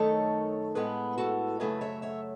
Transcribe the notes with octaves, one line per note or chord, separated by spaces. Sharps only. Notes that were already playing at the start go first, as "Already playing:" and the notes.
Already playing: F#2 D#3 A3 D#4 A4 C#5
A2 G#3 B3 G#4 B4
F#4 A4
F#2 C#3 F#3 A3 G#4 B4
C#5 E5
C#5 E5